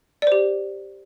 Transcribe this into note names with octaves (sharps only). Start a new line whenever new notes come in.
G4 C5 D5